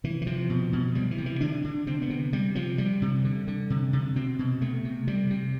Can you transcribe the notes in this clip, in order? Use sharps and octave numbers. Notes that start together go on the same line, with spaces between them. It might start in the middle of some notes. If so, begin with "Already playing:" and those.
C3 E3
E3
C3 F3
B2
B2
C3 G3
E3
C3
E3
D3 D4
D3
C3 C4
B3
C3
C3 G3
C3 F3
C3 G3
C3
D3
D3
C3
C3
B2 C4
B2
C3 A3
C3
C3 G3
C3